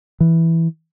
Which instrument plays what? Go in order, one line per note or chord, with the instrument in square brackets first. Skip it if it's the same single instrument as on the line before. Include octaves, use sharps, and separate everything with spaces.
[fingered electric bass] E3